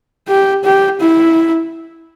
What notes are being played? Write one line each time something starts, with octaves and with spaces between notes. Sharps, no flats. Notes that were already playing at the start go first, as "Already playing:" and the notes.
G4
G4
E4